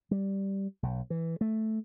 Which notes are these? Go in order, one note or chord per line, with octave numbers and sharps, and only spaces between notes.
G3
B1
E3
A3